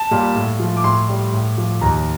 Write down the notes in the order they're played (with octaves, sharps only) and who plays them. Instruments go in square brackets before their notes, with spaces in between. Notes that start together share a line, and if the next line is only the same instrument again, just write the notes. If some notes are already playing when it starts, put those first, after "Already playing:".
Already playing: [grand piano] A5
A#2 G3
A2
F3
D6
A2 C6
G3
A2
F3
D#2 A#5